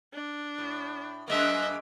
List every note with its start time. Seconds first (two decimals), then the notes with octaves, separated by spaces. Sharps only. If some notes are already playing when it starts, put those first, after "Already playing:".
0.13 D4
0.58 A2
1.28 F#2 G#3 A#3 D#5 E5